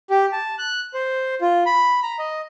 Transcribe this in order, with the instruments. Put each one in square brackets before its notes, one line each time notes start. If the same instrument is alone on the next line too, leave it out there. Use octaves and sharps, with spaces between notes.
[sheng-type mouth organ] G4
A5
F#6
C5
F4
B5
A#5
D#5